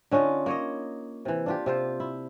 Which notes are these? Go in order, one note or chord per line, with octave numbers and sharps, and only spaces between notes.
D3 C#4 D#4 F4
A#3 C#5 D#5
C3 E3
D4 F4 G4
C3 F4 C5
E4